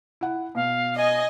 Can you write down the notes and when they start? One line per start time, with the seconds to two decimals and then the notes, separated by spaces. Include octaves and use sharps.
0.21 E4 F#5
0.55 B2 F5
0.97 D#5 G#5